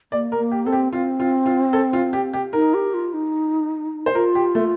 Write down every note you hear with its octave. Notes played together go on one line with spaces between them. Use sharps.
A#3 D5
A#4
A#3
G4
C4 A4
G4
C4 F4
F4
F4
A4
F4
G4
G4
D#4 A#4
G4
F4
D#4
C5
F4 A#4
G4
A3